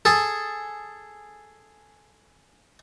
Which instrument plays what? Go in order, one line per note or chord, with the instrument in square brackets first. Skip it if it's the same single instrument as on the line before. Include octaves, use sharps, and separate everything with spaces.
[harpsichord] G#4 A4